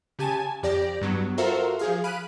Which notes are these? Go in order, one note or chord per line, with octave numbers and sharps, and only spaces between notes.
C#3 G4 G#5 A5
F2 G4 D5 A#6
G2 F#3 B3
F4 F#4 A4 A#4 C5 E5
F3 G#4 F5
F5 B5 F#6 D7 D#7